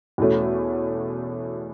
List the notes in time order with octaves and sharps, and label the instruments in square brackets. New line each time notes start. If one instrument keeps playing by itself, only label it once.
[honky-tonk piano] E2 B2 A3 C#4